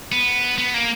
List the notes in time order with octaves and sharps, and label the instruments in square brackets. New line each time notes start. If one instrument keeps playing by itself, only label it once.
[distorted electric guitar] B3
B3
A#3